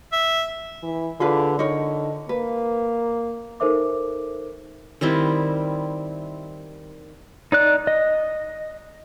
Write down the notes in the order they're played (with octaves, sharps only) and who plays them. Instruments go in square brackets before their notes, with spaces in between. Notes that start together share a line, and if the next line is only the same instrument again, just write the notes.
[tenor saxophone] E5
[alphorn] E3
[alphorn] D3 [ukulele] F4 G#4 B4
[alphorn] D3 [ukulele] D#4 A#4 C#5
[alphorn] A#3 [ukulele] B4
[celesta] D#4 A4 A#4 C5 E5 D6
[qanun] D#3 G3 C4 E4
[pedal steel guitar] D#4 D5 F#6
D#5